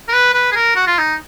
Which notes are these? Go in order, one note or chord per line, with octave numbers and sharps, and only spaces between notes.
A#4
B4
B4
G#4
A#4
F#4
F4
D#4